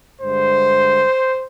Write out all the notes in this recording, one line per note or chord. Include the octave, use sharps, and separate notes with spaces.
G2 D3 G#3 C5